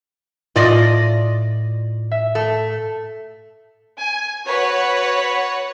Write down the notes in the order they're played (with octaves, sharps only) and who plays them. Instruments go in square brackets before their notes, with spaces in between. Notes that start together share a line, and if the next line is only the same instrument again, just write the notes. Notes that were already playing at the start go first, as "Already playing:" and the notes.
[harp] A2 A#6 [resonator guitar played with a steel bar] F4 D5 D#5
[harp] E5
[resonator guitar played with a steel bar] A3
[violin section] G#5
F#4 B4 C#5 F#5